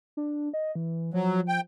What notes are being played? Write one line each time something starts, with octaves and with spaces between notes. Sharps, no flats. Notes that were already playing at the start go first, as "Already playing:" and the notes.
D4
D#5
E3
F3 F#3
G5